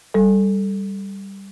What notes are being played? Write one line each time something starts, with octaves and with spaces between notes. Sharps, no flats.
G3 A4